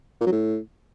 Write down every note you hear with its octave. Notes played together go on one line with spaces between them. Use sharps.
A#2
F#3
A2